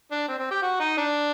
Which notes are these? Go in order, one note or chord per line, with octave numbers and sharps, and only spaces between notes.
D4
C4
C4
G4
F#4
D#4
D4